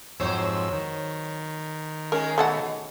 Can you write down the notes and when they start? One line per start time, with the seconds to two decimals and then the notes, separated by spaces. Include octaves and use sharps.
0.20 F2 G#2 F#3 C5 C#5 E6
0.73 D#3
2.12 G#3 C#4 A#4
2.38 B2 A3 A4 F#5